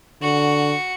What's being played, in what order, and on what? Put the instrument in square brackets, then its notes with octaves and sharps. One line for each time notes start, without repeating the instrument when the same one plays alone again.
[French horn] D3 [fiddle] F#4 C#6